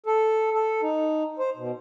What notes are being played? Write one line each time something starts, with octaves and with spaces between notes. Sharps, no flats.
A4
A4
D#4
C5
B2